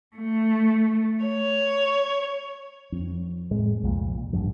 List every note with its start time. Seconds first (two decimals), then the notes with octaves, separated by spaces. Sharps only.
0.16 A3
1.25 C#5
2.92 F2
3.51 A2 G#3
3.83 C2 F2 A#2
4.33 A1 E2 G2 F3